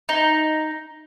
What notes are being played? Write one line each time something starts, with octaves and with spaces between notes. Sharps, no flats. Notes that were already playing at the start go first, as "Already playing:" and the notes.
D#4